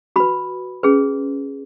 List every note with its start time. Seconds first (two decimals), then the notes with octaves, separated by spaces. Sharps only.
0.16 F#4 B4 B5
0.83 C#4 G#4 B4